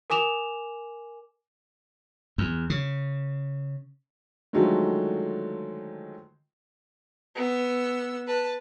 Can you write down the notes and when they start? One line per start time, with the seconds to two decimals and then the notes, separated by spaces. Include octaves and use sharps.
0.10 A#4 G#5 D6 E7 F7
2.38 E2
2.70 C#3
4.53 D3 D#3 F3 F#3 G#3 A3
7.35 B3 E6
8.27 B4 A5